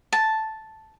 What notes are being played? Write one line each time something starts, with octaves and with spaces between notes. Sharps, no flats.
A5